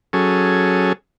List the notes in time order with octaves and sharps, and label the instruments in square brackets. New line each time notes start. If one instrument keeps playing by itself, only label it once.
[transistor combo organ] F#3 C#4 G#4 A4